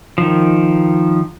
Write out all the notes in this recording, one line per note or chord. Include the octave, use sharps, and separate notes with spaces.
D#3 F3